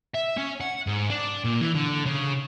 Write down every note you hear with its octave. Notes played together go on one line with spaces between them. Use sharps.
E5
C#4
F#5
G#2
D4
A#2
E3
D3
C#3